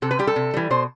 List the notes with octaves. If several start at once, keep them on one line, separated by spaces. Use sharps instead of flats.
C3 A4
B4
G3 G4
A4
C3
E3 G3
B2 C5